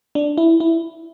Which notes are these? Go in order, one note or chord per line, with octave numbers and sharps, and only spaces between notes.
D4
E4
E4